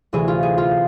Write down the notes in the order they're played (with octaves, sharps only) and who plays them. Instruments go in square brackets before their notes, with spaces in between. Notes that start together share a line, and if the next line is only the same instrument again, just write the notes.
[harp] D2 C3 E3 G#4
F4
G#4
F4